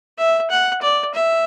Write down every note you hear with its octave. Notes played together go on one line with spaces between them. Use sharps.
E5
F#5
D5
E5